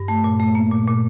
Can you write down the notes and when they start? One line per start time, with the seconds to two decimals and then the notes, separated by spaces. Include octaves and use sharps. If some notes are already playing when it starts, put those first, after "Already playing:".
Already playing: G2
0.08 A3 A5
0.24 A#2
0.40 A3
0.55 A#3
0.71 A#2
0.87 A#2